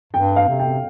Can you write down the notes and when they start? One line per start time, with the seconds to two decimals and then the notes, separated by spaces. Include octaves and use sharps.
0.13 G2 G5
0.36 F5
0.48 C3
0.59 G5